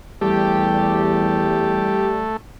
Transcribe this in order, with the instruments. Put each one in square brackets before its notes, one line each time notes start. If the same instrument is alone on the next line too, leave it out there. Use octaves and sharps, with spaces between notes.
[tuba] E2 [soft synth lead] G3 [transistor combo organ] A3 [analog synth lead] G4